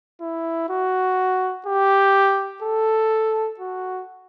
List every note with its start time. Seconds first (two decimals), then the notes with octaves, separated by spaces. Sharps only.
0.21 E4
0.69 F#4
1.66 G4
2.62 A4
3.60 F#4